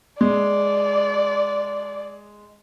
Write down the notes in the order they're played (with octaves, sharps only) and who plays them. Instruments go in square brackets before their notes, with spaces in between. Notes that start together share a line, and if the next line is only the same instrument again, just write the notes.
[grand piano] G#3 [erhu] D5